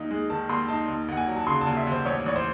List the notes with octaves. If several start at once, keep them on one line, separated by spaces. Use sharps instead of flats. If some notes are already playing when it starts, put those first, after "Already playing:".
Already playing: D#2 D#4
G#3
D#3 A5
D#2 C6
D#4 A5
D#2
D#2 F#5
G#5
F#3
A5
C#3 C6
A5
D#2
E5
D#2 C5
A1 C#5
A1 C#5
C5